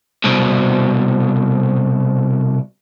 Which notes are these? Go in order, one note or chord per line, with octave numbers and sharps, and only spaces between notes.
C2 B2